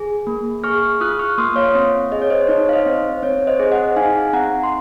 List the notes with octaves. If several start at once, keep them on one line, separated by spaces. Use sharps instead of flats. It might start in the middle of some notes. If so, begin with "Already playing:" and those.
Already playing: G#4
A#3
G#4 C#6 F6
F4 D#6 F#6
C#6 F6
A#3 C6 D#6
C#5 F5
C4
G#4 D#5
C#5
C5 D#5
D#4 C#5
F5
C5 D#5
C4
C4 C#5
C5 D#5
G#4
D#5 F#5
D#4 F5 G#5
C4 F#5 A#5
C6